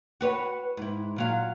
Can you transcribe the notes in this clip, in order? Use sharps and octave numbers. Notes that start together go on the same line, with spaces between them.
F#4 B4 C#5
G#2 E4
A#2 F#3 F5